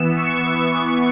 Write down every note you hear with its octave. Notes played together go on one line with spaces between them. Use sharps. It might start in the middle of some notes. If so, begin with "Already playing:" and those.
Already playing: E3 B3 E6
C#6
E3 B3